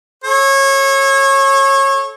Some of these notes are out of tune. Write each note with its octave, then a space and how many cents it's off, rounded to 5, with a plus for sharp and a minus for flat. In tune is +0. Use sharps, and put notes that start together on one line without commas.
A4 -20 C#5 -25